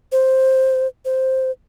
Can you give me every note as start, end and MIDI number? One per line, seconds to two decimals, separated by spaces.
0.12 0.87 72
1.05 1.51 72